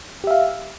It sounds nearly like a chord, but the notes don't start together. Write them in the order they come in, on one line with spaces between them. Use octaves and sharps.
G4 E5 F5